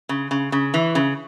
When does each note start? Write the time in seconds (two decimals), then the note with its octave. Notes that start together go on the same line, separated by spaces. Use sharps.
0.09 C#3
0.31 C#3
0.52 C#3
0.74 E3
0.95 C#3